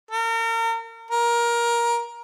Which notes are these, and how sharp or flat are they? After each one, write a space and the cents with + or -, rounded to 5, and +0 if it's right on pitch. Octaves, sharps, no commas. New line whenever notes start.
A#4 -35
A#4 +20